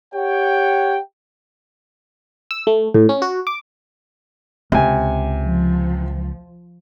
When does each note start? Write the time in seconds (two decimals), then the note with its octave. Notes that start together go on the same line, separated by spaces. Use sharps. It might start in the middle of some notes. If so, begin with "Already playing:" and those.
0.14 G4 C#5 F#5 G5
2.51 E6
2.67 A3
2.94 A2
3.09 C#4
3.22 F#4
3.47 D6
4.72 C#2 C3 G#5
5.41 F3